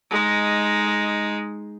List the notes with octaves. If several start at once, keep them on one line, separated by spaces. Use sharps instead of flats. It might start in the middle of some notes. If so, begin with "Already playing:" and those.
G#3 D#4